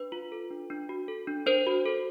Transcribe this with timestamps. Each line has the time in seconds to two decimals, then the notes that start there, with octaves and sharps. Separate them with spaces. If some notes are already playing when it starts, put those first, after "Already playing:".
Already playing: D4 B4
0.12 F4
0.32 A4
0.50 D4
0.70 D4
0.89 F#4
1.08 A4
1.27 D4
1.46 D4 A#4 C5
1.66 F#4
1.85 A4